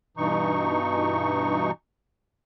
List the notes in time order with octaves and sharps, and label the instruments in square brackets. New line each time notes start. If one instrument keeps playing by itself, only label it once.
[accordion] G2 B2 E3 D#4 C#6